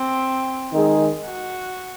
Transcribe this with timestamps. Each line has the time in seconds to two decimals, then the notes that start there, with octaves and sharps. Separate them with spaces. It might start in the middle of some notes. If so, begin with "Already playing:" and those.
Already playing: C4
0.73 D#3 G#3 D#4 G#4
1.26 F#4